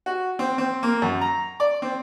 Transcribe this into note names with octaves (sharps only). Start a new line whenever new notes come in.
F#4
C4
C4
A#3
F#2
A#5
D5
C4